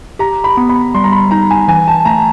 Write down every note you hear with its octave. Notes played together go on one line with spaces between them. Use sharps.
G4 A#5
B5
B3
B5
G3 C6
A#5
B5
D#4 A#5
G#5
E3 G#5
A5
A3 A#5